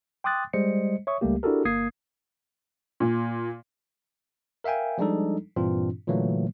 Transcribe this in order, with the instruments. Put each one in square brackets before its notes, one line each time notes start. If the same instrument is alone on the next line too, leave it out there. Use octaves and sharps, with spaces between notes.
[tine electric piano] G5 C6 D6 D#6 F#6 A6
G3 G#3 C5 D#5 C#7
C#5 E5 C#6 D#6
C#2 G3 A3 A#3 G4
D4 E4 F#4 G4 A4 A#4
G1 A#3 D#6 G#6 C7
[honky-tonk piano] A#2
[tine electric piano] A#4 E5 F5 G5 G#5
F3 G3 G#3 D4 D#4 A4
G2 A#2 E3 C4 D4 F4
A#2 D3 E3 F#3 A3 A#3